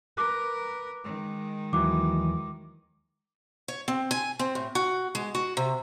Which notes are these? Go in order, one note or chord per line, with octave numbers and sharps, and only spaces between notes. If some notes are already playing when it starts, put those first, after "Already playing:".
A#4 B4 D6 F#6
D#3 G#3
D#2 E3 F#3 D6
C#5
C4
G#5
C4
A2
F#4
G#3
F#4
C3